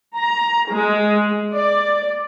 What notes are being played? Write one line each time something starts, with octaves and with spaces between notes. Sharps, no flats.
A#5
G#3
D5